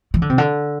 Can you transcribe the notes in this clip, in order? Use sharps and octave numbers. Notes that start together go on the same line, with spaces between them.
E3
D3
C3
D3